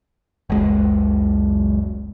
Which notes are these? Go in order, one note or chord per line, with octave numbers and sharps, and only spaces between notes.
F#1 C#2 G#3